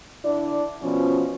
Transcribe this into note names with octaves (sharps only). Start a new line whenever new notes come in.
D3 D4 E4 D5
B2 F3 C#4